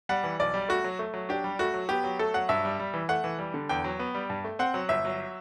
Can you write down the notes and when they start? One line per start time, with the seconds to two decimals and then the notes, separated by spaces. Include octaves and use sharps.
0.09 G3 F#5
0.24 E3
0.39 B1 D5
0.54 G3
0.69 A3 F#4
0.84 F#3
0.99 A3
1.14 F#3
1.29 D4 G4
1.44 G3
1.59 A3 F#4
1.74 F#3
1.89 B3 G4
2.04 F#3
2.19 A3 A4
2.34 F#3 F#5
2.49 G2 E5
2.65 G3
2.79 G3
2.94 E3
3.09 A3 F#5
3.24 E3
3.39 G3
3.54 D3
3.69 E2 G5
3.84 F#3
3.99 B3
4.15 G3
4.30 G2
4.44 A3
4.59 C4 F#5
4.74 F#3
4.89 G1 E5
5.05 F#3